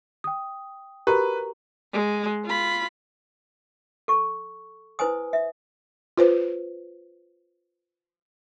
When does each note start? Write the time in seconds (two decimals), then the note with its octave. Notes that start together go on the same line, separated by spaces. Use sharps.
0.24 G5 D#6
1.07 F#4 G4 A#4 B4 A#5
1.93 G#3
2.46 F4 B5
4.08 A4 C#6
4.99 E4 B4 C5 G#5 D#6
5.33 E5
6.17 F4 B4 C5